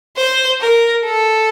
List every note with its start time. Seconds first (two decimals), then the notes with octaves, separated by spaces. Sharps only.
0.17 C5
0.60 A#4
1.05 A4